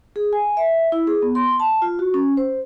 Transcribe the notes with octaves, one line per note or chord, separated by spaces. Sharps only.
G#4
G#5
E5
E4
G#4
B3
C6
A5
F4
F#4
C#4
C5